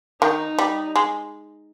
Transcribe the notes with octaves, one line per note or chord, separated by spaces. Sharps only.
D#3 D#4
G3
G#3